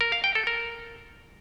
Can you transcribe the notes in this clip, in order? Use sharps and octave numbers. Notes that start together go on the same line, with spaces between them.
A#4
F5
G5
A4
A#4